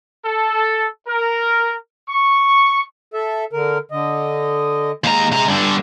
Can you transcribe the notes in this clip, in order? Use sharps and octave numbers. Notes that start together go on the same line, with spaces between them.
A4
A#4
C#6
A4 E5
D3 A#4
D3 D#5
D#2 G#3 A#5
C3 A#5
G2 D3 A5